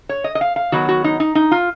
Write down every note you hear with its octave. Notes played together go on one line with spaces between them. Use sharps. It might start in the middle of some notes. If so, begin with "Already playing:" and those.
C#5
D#5
D#5
F5
F5
D#3 F#3 B3 F#4
F#4
D#4
D#4
D#4
F4